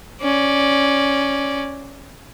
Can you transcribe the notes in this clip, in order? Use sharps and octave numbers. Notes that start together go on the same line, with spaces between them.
C#4 D5